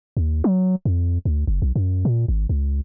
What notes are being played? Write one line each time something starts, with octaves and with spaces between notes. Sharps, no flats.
D#2
F#3
F2
D2
F#1
B1
F#2
A#2
G#1
C#2